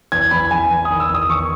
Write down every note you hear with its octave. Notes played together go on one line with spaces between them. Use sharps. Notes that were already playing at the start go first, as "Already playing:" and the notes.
E2 G#6
E2 B5
E2 G#5
E2
D#6
D#3
E6
E2 D#6
D#3 C#6